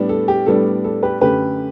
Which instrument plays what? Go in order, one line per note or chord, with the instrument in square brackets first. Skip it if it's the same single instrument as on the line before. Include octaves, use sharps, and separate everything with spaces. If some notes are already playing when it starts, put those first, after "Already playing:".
Already playing: [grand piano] A2 G3 B3 D4
A4
G4
A2 G3 B3 D4 A4
A4
G4 B4
F#2 D3 A3 G4 B4